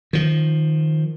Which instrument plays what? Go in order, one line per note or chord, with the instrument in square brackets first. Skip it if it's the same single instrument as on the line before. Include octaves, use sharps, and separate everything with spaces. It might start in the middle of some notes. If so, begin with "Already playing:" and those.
[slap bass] D#3 F3